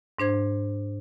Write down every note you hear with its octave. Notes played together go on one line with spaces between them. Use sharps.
G#2 D4 C5 G#6